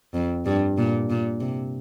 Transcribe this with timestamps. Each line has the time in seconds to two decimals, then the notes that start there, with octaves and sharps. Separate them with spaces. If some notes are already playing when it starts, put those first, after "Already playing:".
0.14 F2
0.46 G2
0.78 A#2
1.10 A#2
1.41 C3